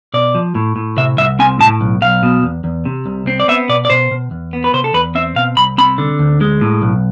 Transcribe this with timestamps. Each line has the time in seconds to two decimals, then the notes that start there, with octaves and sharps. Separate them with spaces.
0.14 B2 D5
0.35 F3
0.55 A2
0.76 A2
0.97 C3 E5
1.18 C2 E5
1.39 C4 G#5
1.59 A2 A5
1.81 B1
2.02 B1 F5
2.23 B2
2.43 E2
2.64 E2
2.85 C3
3.06 C2
3.27 C4
3.40 D5
3.48 B3 E5
3.69 B2 D5
3.85 D5
3.90 B2 C5
4.11 B2
4.31 E2
4.53 B3
4.64 B4
4.74 C3 C5
4.84 A4
4.94 E2 B4
5.15 C4 E5
5.36 B2 F5
5.57 C2 B5
5.78 C4 B5
5.98 D3
6.19 D2
6.41 G#3
6.61 A2
6.82 B1